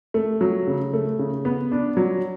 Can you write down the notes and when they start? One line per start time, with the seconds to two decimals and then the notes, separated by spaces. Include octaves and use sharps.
0.14 A3
0.41 F#3
0.67 C#3
0.93 A3
1.19 C#3
1.45 B3
1.72 D4
1.97 F#3